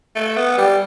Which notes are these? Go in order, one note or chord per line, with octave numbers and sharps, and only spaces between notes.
A3
B3
G3